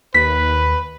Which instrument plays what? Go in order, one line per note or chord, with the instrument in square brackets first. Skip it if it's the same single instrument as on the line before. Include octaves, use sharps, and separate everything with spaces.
[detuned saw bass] D#2 [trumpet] B4 [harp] B6